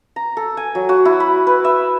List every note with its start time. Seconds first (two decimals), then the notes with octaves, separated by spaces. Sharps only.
0.16 A#5
0.37 A4
0.57 G#5
0.75 F#3
0.89 F#4
1.05 E4
1.20 B5
1.47 B4
1.65 E5